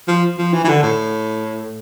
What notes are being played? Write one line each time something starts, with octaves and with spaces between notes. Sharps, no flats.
F3
F3
E3
E3
D3
A2